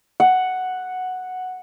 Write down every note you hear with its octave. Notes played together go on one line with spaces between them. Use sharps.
F#5